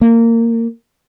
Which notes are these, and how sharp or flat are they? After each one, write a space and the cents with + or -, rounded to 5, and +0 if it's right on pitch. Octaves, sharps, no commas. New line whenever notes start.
A#3 -20